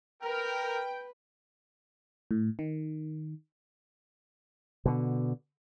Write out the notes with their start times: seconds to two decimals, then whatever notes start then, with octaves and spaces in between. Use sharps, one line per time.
0.22 A#4 B4 G5
2.31 A2
2.59 D#3
4.85 B2 D3